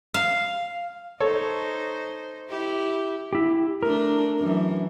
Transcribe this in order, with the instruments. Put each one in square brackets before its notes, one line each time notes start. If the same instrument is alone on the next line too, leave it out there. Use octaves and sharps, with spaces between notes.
[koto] F5
[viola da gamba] D#4 C5 [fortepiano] A4 C#5
[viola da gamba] E4 G4
[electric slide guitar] E4 G4
[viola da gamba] A3 D4 [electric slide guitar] A#4
[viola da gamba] F#2 E3